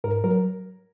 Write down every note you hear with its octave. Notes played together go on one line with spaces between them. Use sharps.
G#2 A#4
F#3 A#4